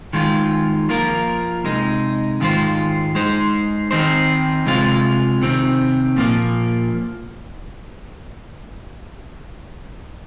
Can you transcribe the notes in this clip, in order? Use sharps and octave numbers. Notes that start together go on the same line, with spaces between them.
D#3 G#3 F4
F3 A#3 F4 A#4
C3 G#3 D#4
G#2 D#3 G#3 F4 C5
G#3 D#4 C5
D#3 C4 D#4 C5
C3 G#3 F4
C3 D#3 C4
A#2 F3 A#3